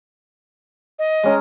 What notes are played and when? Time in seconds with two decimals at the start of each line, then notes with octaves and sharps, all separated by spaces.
0.99 D#5
1.24 G#3 C#4 A#5